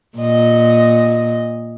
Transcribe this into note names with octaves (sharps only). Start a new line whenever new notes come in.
A#2 D#5